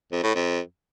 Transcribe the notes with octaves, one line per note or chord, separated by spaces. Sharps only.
F2
A2
F2